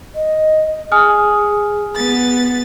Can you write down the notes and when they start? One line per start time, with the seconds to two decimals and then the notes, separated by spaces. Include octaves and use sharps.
0.15 D#5
0.92 G#4 G#5 D#6 F6
1.97 B3 A6